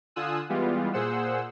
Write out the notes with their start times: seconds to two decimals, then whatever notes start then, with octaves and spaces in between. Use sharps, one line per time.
0.16 D3 F4 G#5 D#6 E6 F#6
0.49 E3 G3 G#3 B3 F4
0.93 A#2 G#4 C5 F#5 E6